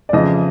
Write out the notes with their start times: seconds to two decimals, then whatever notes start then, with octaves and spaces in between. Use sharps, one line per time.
0.09 D5
0.13 F2 C#3 E3 D#5